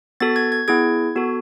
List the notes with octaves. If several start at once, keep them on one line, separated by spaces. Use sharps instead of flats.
B3 F#4 A4 A6
G#6
G#6
B3 E4 G#4 G#6
B3 F#4 A4